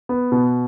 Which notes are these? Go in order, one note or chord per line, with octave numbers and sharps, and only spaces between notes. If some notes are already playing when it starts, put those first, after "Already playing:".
B3
B2